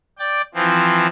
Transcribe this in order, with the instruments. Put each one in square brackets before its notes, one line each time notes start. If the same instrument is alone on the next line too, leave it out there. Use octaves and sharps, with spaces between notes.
[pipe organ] D5 G5 D6
E3 F3 C4